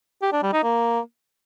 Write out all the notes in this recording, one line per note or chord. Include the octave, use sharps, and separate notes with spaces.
G4
D4
G3
D#4
A#3